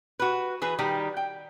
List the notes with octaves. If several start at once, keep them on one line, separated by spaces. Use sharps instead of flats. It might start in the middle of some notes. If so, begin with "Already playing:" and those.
F#4 B4
E3 G#4 B4
D#3 G3 G4
G5